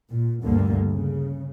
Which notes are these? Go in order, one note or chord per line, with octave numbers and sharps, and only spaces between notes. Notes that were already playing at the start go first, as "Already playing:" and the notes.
A#2
D2 G2 D3 A#3
C#3